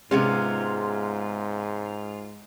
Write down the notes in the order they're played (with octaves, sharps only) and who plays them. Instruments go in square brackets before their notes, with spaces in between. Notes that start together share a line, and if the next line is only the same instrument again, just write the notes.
[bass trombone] G#2 [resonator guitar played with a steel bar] C3 B3 C#4 [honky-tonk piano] G#3 [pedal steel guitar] F4